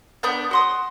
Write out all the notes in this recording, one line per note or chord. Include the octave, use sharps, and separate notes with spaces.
B3 D4 G6
F#4 C6 D#6